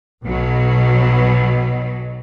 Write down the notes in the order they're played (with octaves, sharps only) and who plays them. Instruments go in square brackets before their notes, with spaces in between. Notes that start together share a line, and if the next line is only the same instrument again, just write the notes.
[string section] B1 B2 F#3